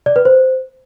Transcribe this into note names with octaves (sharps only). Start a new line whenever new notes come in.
D5
B4
C5